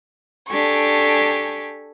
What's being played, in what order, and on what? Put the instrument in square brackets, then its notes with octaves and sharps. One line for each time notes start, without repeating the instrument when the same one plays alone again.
[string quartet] D4 G4 A4 G#5 C#6